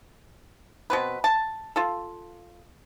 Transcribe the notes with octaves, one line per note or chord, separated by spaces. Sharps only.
B2 C4 B4
A5
F4 A4